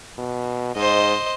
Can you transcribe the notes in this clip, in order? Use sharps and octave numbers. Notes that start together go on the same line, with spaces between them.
B2
G#2 C5 D#5